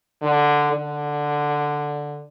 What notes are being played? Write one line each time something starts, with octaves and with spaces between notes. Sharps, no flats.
D3
D3